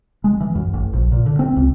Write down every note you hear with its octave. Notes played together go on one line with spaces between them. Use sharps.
G#3
E3
F#2
A1
A#1
A#2
D3
C4
C#2